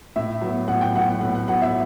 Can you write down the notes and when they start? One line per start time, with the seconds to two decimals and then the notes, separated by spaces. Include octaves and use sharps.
0.16 A2 E5
0.41 F#3 B3
0.68 A2 F#5
0.81 G5
0.94 F#3 B3 F#5
1.21 A2 F#5
1.35 F#5
1.48 F#3 B3 F#5
1.62 E5